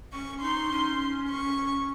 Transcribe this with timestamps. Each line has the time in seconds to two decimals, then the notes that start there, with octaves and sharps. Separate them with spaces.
0.13 C#4 C#6
0.42 D#4 C6
0.72 C#4
1.30 C#6